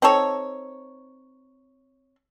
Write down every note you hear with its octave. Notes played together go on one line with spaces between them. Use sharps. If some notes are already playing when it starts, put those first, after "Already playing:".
C4 D#4 A4 C#5